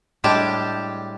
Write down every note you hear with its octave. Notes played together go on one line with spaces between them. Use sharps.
A2 G3 G#3 D4 G4 A5